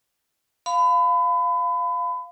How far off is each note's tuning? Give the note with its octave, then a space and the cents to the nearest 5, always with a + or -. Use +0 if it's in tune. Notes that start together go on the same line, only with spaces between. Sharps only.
F5 +0 B5 +30